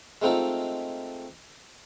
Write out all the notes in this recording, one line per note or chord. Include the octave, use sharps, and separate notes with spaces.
G#3 A3 C4 D#4 F4 A4